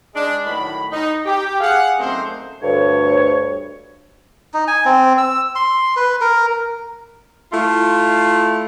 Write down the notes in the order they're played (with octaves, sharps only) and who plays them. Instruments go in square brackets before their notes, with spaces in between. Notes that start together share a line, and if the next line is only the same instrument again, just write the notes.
[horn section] G#3 D4
A2 D#3 F#3 B5
D#4
G4
G#4 F5 F#5
F#2 A3 A#3 C4 D#4 C5
[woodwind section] D2 G2 C#5
[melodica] D#4
G#5
C4
E6
C6
B4
A#4
[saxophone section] A3 E4 F4